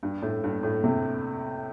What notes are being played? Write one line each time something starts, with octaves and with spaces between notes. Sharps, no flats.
G2
A2
G2
A2
C3